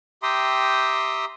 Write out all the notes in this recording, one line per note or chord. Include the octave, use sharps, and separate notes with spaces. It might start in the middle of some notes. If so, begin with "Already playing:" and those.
G4 E5 G5 A#5 C6 D#6